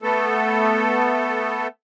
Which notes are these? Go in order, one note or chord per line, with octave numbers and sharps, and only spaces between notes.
A3 B3 A4